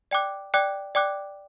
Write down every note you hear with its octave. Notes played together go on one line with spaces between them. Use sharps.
D5 G5 D6 F#6
D5 G5 D6 F#6
D5 G5 D6 F#6